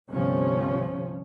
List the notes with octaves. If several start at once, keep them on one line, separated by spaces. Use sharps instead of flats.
G1 C2 C3 F3 C#4